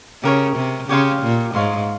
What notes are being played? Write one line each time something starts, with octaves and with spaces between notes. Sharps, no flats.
C#3 G4 A#4 C#5
C3
C#3 G4 C#5 F5 C6
A#2
G#2 C#5 F5 C6